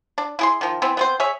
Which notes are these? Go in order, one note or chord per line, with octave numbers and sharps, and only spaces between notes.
D4
E4 G#4 C6
D#3 F3
E3 B3 C4
B3 C4 C5
G#4 C#5 E5